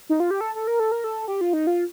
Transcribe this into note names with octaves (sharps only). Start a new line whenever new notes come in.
D#4
F4
G4
A4
A4
A#4
A4
A#4
A4
G4
F4
D#4
F4